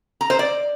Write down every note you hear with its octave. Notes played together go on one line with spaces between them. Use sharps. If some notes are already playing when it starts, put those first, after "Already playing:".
A#5
C5
D5